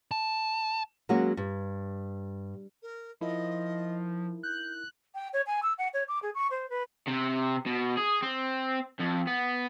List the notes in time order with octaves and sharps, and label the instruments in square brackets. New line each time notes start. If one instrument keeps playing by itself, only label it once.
[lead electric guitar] A5
[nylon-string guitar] F#3 G#3 A#3 C#4 F#4
G2
[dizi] A#4
[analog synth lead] F3 [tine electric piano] D#4 E4 A#4 [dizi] D#5
[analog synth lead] F#6 [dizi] G6
[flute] G5
C#5
G#5
E6
F#5
C#5
D6
G#4
C#6
C5
B4
[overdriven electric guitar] C3
B2
G#4
C4
F2
B3